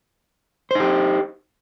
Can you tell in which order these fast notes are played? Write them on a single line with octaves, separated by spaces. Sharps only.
C5 D#4 G4